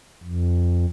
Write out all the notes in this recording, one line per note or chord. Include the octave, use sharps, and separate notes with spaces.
F2